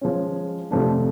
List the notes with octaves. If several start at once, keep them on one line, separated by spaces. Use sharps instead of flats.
F3 G#3 C#4
F2 C3 F3 A3 D4